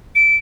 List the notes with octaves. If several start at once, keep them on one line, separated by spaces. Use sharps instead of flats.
D7